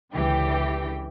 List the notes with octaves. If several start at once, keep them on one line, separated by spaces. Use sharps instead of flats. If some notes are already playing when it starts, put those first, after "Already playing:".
C#2 D3 E3 G4 G5